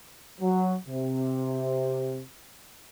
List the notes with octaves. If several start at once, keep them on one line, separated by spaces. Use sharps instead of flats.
F#3
C3